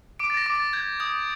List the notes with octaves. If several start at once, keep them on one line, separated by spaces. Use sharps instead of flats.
D6 D7
A6
A#6
D6
A6
G6 G#6
D#6 G6